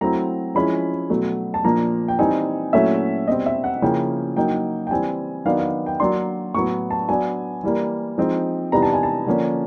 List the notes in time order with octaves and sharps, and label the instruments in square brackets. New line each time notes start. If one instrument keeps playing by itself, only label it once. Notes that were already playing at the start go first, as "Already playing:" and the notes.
[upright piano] F#3 A3 C4 E4 A#5
F3 G#3 C#4 E4 B5
B2 F#3 A3
A5
A#2 F3 A#3 D4 A#5
G5
E3 G3 C4 D#4 G#5
A#2 F#3 A3 C#4 E4 E5
B2 G3 C4 D#5
E5
F#5
C#3 F3 A#3 C#4 E4 G5
F#3 A#3 D#4 G5
G5
E3 G3 C4 G#5
D#3 F#3 B3 D4 F5
F5
G5
F#3 A#3 D4 C6
A2 F#3 B3 C#6
A5
F#3 B3 D4 G#5
E3 G3 A#3
F3 G#3 C4 D#4
C3 E3 G3 B3 D#4 A#5
A5
G#5
A5
D3 F3 A#3 C#4